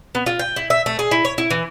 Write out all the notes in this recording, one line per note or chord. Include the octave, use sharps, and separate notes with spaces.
B3
F4
G5
E4
E5
A3
G#4
E4
C#5
E4
E3